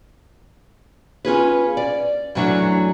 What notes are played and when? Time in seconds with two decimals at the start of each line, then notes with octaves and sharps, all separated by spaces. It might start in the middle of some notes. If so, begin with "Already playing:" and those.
1.25 C#4 F4 G#4 B4
1.77 D5
2.35 F#2 E3 F#3 A3 D4